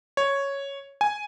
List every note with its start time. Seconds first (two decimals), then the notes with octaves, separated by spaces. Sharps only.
0.17 C#5
1.01 G#5